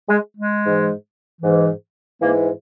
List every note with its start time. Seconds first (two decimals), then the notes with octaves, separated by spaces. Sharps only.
0.09 G#3
0.36 G#3
0.62 G#2 E3
1.41 G#2 E3
2.21 G#2 E3 A#3